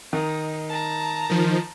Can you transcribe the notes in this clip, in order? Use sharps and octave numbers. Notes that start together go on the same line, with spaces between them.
D#3 D#4
A5 A#5
D#3 F3